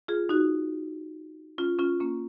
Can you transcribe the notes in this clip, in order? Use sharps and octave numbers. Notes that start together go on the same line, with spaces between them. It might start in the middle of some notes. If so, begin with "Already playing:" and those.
F4 G#4
D#4 F#4
C#4 F4
C#4 F4
A#3 C#4